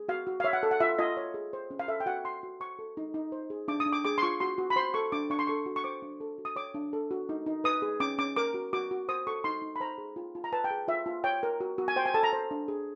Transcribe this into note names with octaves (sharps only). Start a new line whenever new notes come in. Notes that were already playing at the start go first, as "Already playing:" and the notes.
Already playing: G#4
F#4 F5
F#4
F5
C#5 E5
F#5
A4
F#5
F4 E5
F4 D#5
C#5
G#4
C5
C#4
F5
A4 E5
G5
F#4 F#5
F#4 C6
F#4
C5 C#6
A4
D#4
D#4
C5
G#4
D4 D6
D#6
D4
D6
G#4 D6
C6
F4 C#6
F#4 C6
F#4
B5
C5 C6
A4 C#6
D4 D6
D4 C#6
C6
A4 C#6
F#4
C#6
C5 D6
D4
A4
F#4
D#6
C#5 D6
D4
A4
F#4
D#4
D#4
B4 D#6
G#4
C#4 D6
C#4 D6
A#4 D6
F#4
F#4 D6
F#4
C5 D#6
A4 C#6
D#4 C6
D#4
B5
C5 A#5
G#4
F4
F4
A#5
B4 A5
G5
G#4
F4 E5
F4
C#5 G5
A#4
F#4
F#4
G#5
C5 G5
G#5
A4 A5
A#5
C5
D4
G#4